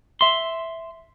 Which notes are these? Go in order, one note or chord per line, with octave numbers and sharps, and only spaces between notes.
E5 C6